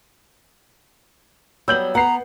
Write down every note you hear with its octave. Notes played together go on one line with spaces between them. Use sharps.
F#3 G3 B3 E6 G6 F#7
B3 F#5 A#5 C7